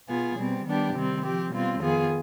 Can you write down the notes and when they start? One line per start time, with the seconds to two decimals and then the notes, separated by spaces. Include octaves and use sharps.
0.08 B2 B3 F4 G#4
0.37 B2 G3 C4
0.65 D#3 G3 B3 D4 G4
0.94 C3 D#3 G3 C4
1.22 F3 C4 G4
1.51 B2 G3 C4 F4
1.80 F2 D#3 B3 F4 G#4